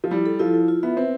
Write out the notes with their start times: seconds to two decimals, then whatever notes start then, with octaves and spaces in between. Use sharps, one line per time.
0.04 F3
0.11 G3 E4
0.26 A4
0.39 F3 E4
0.54 E4
0.68 F4
0.83 B3 E5
0.97 C4 B4